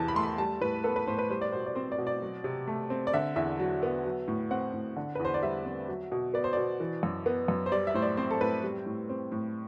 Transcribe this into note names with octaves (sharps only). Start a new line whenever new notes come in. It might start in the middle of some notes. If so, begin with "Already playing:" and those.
Already playing: E2 C3 E3 A5
B5
A3 C6
B5
G3 A5
A2 B4
B3 A4
B4
A2 C5
B4
G3 C5
D5
B2 C5
D5
C4 C5
D5
B2
D5
F#3
C3
A3
C4
D5
D3 E5
E2 E5
F#3
B3
F#3
A2
C4 F#5
A2
D3
B4
E2 C5
D5
G3 E5
C4
F#3
B2
B3 D5
C5
B2 D5
E3
F#2
B3
F#2
C5
G3 D5
E5
A2 C5
D5
C4 C5
A4
A2 B4
G3
A2
C4
A2